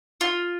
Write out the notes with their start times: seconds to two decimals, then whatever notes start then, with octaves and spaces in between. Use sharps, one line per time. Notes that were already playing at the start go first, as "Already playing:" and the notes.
0.21 F4